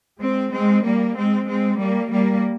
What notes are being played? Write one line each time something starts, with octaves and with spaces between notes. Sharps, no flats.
G#3 C4
G#3 C4
G3 A#3
G#3 C4
G#3 C4
G3 A#3
G3 A#3